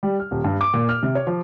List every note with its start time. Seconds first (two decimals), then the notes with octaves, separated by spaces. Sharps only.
0.03 G3
0.20 F6
0.31 D#1
0.44 G2
0.61 D6
0.74 A#2
0.89 F6
1.03 C3
1.15 C#5
1.27 F3